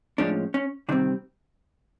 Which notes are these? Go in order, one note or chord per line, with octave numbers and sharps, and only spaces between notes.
A2 F3 G#3 C#4 D4
C#4
C3 D#3 G3 C4 D4